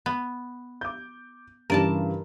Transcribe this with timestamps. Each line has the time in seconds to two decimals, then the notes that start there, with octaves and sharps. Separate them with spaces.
0.06 B3
0.81 D6 G6
1.70 G2 C#3 E3 A#4 D5 A5